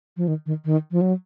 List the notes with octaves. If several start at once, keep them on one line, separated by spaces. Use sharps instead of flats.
F3
D#3
D#3
D#3
F3
F#3